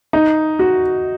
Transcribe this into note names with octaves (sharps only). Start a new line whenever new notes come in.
D#4
F#4